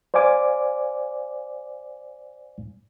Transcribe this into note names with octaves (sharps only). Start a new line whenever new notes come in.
C5 D5 F5 G#5 D6